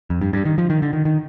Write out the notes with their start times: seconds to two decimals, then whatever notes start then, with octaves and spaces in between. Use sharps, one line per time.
0.10 F2
0.21 G2
0.33 G2
0.45 D#3
0.58 F3
0.70 D#3
0.82 D3
0.93 D#3
1.05 D#3